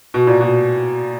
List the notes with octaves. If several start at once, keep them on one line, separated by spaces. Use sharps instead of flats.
B2
A#2
B2